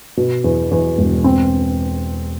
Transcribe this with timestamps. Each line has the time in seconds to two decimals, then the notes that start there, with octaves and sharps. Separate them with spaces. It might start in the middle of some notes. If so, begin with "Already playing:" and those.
0.17 B2
0.44 E2
0.71 E2
0.98 E1
1.24 C4